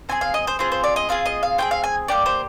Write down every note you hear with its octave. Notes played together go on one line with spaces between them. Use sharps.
C4 F4 G#4 G#5
F5
D#5
C5
C4 F4 G#4 C5
C5
D5
D#5
C4 F4 G#4 F5
D#5
F5
C4 F4 G#4 G5
F5
G#5
A#3 D4 G4 D5
C5